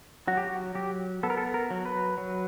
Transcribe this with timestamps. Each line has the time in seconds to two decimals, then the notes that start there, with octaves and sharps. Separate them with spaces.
0.27 F#3 F#4
0.37 G4
0.47 F#4
0.75 F#3 G4
1.23 B3 A4
1.30 A#4
1.37 A4
1.54 A#4
1.70 F#3
1.86 B4
2.18 F#3